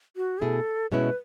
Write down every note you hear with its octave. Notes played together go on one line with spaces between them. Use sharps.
F#4
B2 A3 E4 G#4 A4
B2 G#3 C#4 E4 B4